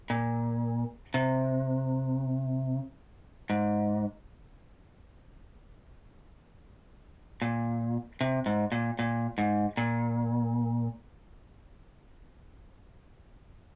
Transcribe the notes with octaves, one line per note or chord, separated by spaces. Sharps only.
A#2
C3
G#2
A#2
C3
G#2
A#2
A#2
G#2
A#2